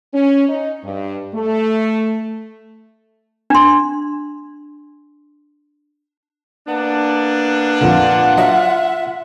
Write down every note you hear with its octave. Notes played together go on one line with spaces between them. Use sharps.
C#4
D#4
G2
A3
D4 C6
A#3 B3 D4
F2 A#2 D3 F4 F#5
F#3 D#5 E5